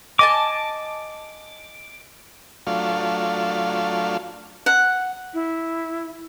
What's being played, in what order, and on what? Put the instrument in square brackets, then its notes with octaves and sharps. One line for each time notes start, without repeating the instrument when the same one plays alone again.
[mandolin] D#5 G#5 A5 [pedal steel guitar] D6
[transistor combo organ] F#3 A3 D4 F4 F5
[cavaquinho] F#5
[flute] E4